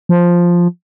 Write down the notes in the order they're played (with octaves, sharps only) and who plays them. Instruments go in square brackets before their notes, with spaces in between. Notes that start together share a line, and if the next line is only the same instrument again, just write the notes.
[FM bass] F3